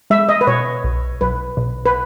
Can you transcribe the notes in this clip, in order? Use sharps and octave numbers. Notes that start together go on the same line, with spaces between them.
G#3 E5
D#5
B4
B2 C#5
B1
B1 B4
B1
B4